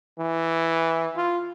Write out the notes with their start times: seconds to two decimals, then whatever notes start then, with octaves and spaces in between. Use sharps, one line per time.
0.18 E3
1.16 F4